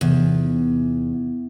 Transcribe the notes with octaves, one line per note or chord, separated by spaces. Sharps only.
E2 C3 D#4